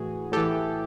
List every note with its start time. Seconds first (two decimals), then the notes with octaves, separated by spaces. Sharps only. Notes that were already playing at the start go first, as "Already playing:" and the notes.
Already playing: A2 E3 F#4 G#4
0.32 A2 G4 A4
0.37 E3